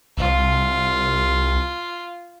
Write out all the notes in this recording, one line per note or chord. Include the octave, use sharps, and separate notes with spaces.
C2 F4